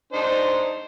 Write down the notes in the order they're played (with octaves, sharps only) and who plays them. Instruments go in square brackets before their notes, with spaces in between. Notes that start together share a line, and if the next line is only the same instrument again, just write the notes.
[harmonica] D4 D#4 C5